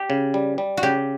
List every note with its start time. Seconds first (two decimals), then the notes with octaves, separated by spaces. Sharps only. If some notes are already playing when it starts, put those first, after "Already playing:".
Already playing: G4
0.10 C#3
0.34 G3
0.58 G3
0.77 F#4
0.83 C#3 G4